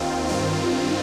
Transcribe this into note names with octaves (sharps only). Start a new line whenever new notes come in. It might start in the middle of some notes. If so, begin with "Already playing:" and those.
Already playing: D#2 D#3 C4 F4
G2 D#3 C4 F4